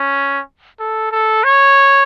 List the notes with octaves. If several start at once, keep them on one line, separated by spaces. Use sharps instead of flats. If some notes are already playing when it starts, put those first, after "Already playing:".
Already playing: C#4
A4
A4
C#5